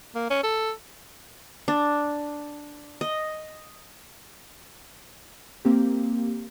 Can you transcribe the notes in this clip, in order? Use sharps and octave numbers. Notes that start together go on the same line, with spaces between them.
A#3
C#4
A4
D4
D#5
A#3 C4 G4